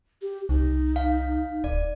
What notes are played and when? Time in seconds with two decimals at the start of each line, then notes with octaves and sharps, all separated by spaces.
0.22 G4
0.49 C2 D#4
0.96 F5
1.64 D1 D5